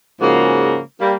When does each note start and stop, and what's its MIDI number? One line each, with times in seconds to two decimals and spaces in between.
0.21 0.79 44
0.21 0.79 49
0.21 0.79 53
0.21 0.79 56
0.21 0.79 58
0.21 0.79 66
1.00 1.14 55
1.00 1.14 58